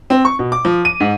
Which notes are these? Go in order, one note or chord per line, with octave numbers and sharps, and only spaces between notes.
C4
C#6
B2
D6
F3
D#7
G#2